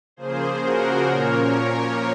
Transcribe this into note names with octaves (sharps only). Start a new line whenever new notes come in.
C#3 F3 A#3 G#4 C5
F#4 A#4
A#2 F3 A#3 C#4 A#4 C#5
A#4 C#5